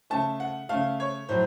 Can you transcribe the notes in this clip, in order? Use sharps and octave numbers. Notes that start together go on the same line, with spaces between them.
C#3 A3 A5
F#5
C#3 A3 F5
C#5
A2 F#3 C5